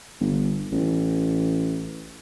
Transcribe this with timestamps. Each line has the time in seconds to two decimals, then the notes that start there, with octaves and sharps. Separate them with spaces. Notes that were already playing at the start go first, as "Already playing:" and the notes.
0.20 G1
0.72 A1